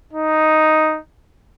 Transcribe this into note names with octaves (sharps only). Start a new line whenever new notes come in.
D#4